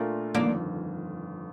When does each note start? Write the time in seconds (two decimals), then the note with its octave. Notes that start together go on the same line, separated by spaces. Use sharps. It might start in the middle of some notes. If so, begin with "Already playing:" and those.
Already playing: A#2 A3 D4 F4 A#4
0.34 G1 F2 D#3 A#3 D4